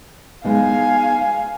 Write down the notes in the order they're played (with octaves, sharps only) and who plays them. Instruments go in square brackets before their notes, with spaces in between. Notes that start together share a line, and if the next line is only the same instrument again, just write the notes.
[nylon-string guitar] G#3 B3 D#4 [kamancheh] F5 G#5